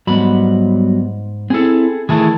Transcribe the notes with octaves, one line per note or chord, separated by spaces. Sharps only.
G#2 F#3 G3 B3 B5
C4 E4 G#4 A4
D#3 E3 A3 E4 G#4 A5